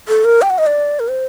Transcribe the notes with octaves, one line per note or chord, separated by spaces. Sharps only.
A4
A#4
G5
F#5
D#5
D5
A#4
C5